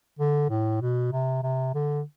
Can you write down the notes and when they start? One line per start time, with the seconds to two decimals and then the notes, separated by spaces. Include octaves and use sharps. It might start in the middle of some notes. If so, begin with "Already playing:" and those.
0.19 D3
0.50 A2
0.81 B2
1.12 C3
1.43 C3
1.74 D3